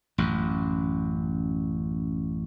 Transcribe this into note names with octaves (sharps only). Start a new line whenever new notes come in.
A1 F#2